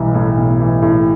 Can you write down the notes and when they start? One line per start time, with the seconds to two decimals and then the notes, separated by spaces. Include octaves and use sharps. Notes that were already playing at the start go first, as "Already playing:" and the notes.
Already playing: B1 E3 G3
0.15 A2
0.37 B1
0.60 E3
0.82 A2